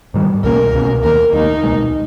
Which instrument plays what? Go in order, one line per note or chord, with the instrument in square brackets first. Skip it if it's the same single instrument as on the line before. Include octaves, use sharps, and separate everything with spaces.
[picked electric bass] G#2 D#3 G3
[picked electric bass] C#2 B2 A#3 C#4 [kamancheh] A#4
[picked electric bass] C#2 B2 A#3 C#4
[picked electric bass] D#2 D#3 A#3 [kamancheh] A#4
[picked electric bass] D#2 D#3 A#3 [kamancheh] D#4
[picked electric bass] C#2 B2 G#3